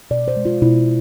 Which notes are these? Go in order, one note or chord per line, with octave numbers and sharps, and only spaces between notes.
B2 D5
C5
G#3
F4
B2 E4